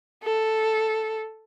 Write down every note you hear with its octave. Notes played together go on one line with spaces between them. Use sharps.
A4